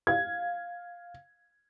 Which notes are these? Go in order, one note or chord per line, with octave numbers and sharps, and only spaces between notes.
F5 G#6